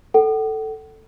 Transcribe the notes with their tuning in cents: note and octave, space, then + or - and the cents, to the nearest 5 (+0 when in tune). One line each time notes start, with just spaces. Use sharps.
A4 +0 F#5 +40